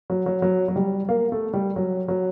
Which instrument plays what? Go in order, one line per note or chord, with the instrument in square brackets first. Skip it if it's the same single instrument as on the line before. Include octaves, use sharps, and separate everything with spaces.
[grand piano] F#3
F#3
F#3
F#3
G3
A#3
A3
G3
F#3
F#3